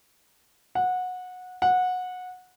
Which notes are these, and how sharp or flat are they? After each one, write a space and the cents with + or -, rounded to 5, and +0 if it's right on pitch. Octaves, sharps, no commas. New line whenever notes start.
F#5 -20
F#5 -20